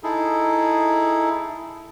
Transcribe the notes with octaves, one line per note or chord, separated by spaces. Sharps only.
D#4 E4 G#4 A4